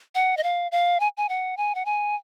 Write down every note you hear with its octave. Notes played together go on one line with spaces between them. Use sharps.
F#5
D#5
F5
F5
G#5
G#5
F#5
G#5
F#5
G#5